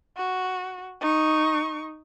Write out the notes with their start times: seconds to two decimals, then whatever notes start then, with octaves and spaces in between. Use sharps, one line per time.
0.17 F#4
1.01 D#4 C#6